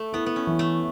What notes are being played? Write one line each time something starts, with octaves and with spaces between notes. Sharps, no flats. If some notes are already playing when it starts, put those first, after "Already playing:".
Already playing: A3 A4
B3 E4
B3
C#4
E3
A3